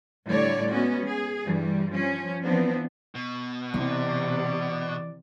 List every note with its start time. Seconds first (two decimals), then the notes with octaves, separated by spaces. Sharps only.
0.26 A2 D3 G3 C#5 D5
0.69 G#3 B3 C#4 F#4
1.03 G#4
1.44 G2 E3 G3
1.90 F3 C#4
2.41 E3 F3 B3 C4 D4
3.15 B2
3.74 C3 E3 D5